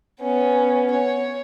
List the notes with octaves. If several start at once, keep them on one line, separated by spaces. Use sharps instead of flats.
B3 C#4
C#5